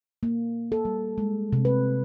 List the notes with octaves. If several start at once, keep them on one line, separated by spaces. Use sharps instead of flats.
A#3
A4
G3
G#3
C3
B4